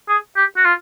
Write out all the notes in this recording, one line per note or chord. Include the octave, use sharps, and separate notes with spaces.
G#4
G4
F#4
F4